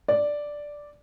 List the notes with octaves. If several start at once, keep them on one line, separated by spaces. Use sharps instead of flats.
D5